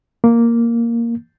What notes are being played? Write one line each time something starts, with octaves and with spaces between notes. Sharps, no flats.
A#3